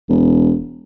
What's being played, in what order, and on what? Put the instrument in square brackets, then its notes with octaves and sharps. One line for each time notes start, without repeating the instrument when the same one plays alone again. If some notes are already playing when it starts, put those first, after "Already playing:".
[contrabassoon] E1